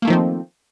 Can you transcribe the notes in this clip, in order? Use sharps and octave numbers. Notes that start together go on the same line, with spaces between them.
D#3 F3 A3 A#3 C4